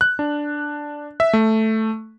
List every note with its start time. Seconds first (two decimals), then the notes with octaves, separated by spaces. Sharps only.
0.01 F#6
0.19 D4
1.20 E5
1.33 A3